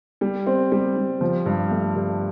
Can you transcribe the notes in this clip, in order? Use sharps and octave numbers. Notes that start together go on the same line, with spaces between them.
G3
C4
G3
G3
F3
G2
A3
G2